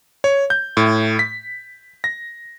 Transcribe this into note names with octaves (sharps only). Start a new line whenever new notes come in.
C#5
G6
A2
B6
A#6